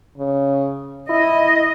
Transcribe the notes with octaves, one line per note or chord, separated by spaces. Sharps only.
C#3
E4 D#5